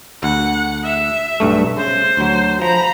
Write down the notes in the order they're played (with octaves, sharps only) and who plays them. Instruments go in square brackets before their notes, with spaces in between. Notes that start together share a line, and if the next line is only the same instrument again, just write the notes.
[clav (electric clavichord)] D2 [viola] F#5
[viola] E5
[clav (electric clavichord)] B1 G2 A3
[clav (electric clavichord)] C#3 [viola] C5
[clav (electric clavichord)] D2 F#3
[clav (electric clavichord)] F3 [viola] A#5 B5